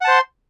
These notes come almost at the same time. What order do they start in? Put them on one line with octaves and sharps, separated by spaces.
F#5 A5 C5 C6